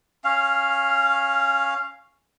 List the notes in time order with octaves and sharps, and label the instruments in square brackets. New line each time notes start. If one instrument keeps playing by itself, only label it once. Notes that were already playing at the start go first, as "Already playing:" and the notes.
[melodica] C#4 F5